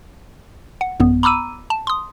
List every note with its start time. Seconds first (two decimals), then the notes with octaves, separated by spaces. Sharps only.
0.81 F#5
1.00 A1 F#2 B3
1.23 A#5 B5 D6 E6 D#7
1.70 A5
1.87 C6 D#6